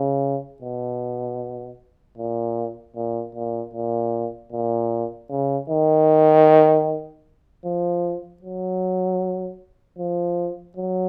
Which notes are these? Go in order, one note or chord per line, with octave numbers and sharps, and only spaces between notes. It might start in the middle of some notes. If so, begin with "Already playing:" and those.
Already playing: C#3
B2
A#2
A#2
A#2
A#2
A#2
C#3
D#3
F3
F#3
F3
F#3